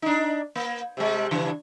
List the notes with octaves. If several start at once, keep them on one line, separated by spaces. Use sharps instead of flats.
D4 D#4
A#3
C3 G3 G#3
G2 C#3 E3